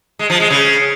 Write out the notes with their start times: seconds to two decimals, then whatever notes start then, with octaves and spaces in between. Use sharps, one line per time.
0.19 G#3
0.30 F3
0.40 G#3
0.50 C#3